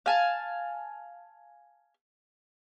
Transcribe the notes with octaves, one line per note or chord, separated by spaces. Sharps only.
F5 G#5 A5